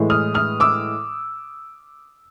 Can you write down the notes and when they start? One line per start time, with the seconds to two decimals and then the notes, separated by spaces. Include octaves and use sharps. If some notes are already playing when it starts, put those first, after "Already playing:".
Already playing: A2 E3 G#3
0.10 D#6 F6
0.34 D#6 F6
0.60 D6 E6